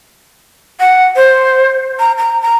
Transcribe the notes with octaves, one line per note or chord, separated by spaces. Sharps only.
F#5
C5
A#5
A#5
A#5